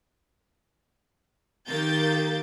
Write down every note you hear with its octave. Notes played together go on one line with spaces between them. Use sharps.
D#3 A#3 G4 G6 A6